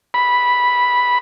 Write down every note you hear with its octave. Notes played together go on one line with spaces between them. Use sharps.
B5